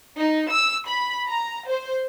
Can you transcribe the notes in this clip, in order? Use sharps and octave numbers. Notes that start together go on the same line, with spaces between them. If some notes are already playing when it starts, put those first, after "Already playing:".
D#4
E6
B5
A#5
C5